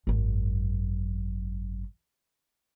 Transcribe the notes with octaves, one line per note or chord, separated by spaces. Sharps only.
G#1 F#2